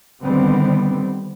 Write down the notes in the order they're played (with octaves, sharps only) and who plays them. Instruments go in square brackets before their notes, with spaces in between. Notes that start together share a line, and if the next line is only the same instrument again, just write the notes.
[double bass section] D3 D#3 G3 B3 C4